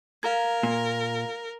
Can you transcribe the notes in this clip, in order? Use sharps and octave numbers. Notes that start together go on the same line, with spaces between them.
A#4 F5 A#5 G#6
A#2